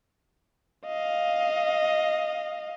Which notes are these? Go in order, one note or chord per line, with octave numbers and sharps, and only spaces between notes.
D#5 F5